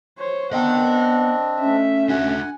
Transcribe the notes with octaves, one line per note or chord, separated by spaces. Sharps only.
C5 C#5
B3 C4 D4 D#5 F#5 G5
A3 C#4 E5
D4 F#4 F#5 G#5